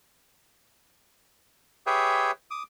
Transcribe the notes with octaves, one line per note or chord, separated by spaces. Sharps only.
G4 G#4 B4 C#5 E5 G5
D6 D#6